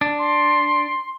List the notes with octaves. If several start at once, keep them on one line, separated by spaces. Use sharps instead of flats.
D4
C6